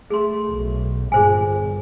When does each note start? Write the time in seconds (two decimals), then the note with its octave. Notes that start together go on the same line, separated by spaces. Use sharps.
0.10 A3 G#4 C6
0.47 B1
1.12 G1 A#2 G#4 C5 G#5